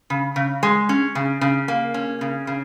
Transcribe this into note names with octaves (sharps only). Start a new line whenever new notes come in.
C#3
C#3
G#3
C#4
C#3
C#3
A#3
C#4
C#3
C#3